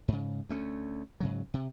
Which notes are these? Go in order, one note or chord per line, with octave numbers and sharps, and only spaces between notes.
G#2 C#3
D2 A3 C#4
G#2 C#3 F#3
C3